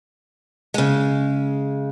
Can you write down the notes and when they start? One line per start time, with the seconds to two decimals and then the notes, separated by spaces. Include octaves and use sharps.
0.74 C#3 G#3